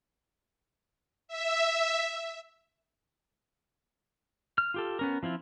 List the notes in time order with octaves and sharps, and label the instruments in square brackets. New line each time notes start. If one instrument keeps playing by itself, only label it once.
[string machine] E5
[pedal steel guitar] F6
F4 G4 A4
B3 C#4 A#4
F3 C4 E4 F4